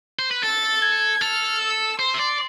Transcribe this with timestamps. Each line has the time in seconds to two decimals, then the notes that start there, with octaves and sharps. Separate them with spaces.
0.19 C5
0.31 B4
0.43 A4 A6
0.82 G#6
1.21 A4 F6
1.60 E6
1.99 C5 C6
2.14 E5
2.19 D5